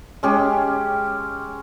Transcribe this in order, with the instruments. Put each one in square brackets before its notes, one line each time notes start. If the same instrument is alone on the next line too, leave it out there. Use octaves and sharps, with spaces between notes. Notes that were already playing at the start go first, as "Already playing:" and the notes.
[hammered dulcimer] G#3 C#4 G4